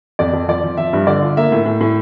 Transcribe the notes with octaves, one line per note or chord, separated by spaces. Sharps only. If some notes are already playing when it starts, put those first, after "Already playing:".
F2 D5
F2
F3 D5
F3
F3 E5
G2
D3 D5
F4
A#3 E5
A2
A2
A2